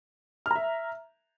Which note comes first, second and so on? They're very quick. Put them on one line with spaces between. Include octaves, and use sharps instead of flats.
F6 A#5 E5